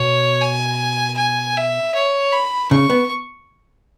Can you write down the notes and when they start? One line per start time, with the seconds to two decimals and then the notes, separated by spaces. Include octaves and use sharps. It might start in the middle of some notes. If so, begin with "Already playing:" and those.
Already playing: B2 C#5
0.41 G#5
1.17 G#5
1.56 E5
1.94 C#5
2.32 B5
2.70 C#3 C#6
2.90 B3